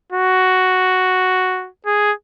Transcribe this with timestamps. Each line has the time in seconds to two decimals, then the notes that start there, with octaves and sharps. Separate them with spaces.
0.12 F#4
1.86 G#4